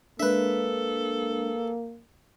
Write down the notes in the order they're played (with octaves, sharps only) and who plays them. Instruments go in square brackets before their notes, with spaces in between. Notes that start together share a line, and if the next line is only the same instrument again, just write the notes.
[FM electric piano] G#3 D4 [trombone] A#3 [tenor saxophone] A4 [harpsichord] B4 E5